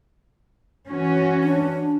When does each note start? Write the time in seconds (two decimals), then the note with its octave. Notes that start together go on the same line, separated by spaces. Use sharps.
0.89 E3 C#4 F#4
1.44 D4